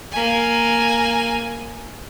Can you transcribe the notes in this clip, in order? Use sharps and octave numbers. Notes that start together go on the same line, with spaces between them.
A#3 G#5